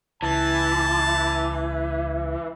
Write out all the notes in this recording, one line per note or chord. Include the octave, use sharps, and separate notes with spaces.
C#2 E3 A5